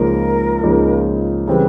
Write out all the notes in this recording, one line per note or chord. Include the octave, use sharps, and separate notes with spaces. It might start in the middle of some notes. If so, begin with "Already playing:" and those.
Already playing: C#2 C#3 F3 A#3 D#4 A#4
C#2 C#3 F3 A#3 D#4
C#3 E3 G3 C4 B4